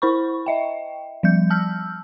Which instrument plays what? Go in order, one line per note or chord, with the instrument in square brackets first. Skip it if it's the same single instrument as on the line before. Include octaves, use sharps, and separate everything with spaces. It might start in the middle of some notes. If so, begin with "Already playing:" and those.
[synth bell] E4 C5 B5 C#6
D#5 E5 G5
F3 G3 G6
A5 E6 F6 G6